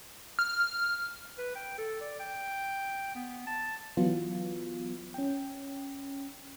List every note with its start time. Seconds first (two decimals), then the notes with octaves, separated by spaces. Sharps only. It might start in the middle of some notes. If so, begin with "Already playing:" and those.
0.39 F6
1.38 B4
1.56 G5
1.78 A4
2.01 D5
2.20 G5
3.15 B3
3.47 A5
3.97 E3 F#3 B3 F4
5.14 C#4 G5